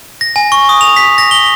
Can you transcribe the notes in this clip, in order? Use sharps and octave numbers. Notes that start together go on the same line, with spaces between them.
A#6
G#5
C#6
D#6
F7
B6
A#6
G7